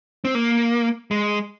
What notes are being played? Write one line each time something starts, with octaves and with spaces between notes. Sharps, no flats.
C4
A#3
G#3